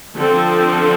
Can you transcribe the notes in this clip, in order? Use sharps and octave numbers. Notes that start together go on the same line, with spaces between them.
D3 F3 C4 A4